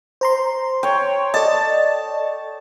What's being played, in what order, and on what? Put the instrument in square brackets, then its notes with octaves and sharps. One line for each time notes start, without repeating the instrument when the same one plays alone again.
[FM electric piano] C5 A#5 C6
[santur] C#5 G5
[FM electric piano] A4 D5 D#5 [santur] A5